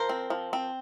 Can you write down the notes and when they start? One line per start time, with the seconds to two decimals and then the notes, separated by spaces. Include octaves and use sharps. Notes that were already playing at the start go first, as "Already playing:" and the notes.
Already playing: F3 A#4 C5
0.09 C4
0.30 F3
0.53 C4